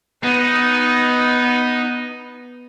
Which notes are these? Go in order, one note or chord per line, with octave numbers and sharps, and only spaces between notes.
B3 D#4